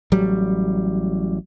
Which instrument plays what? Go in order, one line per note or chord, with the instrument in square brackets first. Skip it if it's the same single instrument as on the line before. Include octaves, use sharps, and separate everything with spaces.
[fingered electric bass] A1 F#3 G3